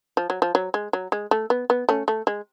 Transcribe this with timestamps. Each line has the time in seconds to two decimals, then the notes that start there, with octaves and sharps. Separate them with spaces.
0.17 F3
0.30 F#3
0.42 F3
0.55 F#3
0.74 G#3
0.93 F#3
1.12 G#3
1.31 A3
1.50 B3
1.70 B3
1.89 A3 C#4
2.08 A3
2.27 G#3